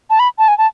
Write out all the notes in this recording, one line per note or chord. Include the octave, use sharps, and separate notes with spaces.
A5
B5
A5
G#5
A5